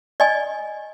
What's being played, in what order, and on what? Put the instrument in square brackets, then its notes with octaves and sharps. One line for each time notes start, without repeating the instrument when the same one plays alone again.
[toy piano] D5 D#5 G#5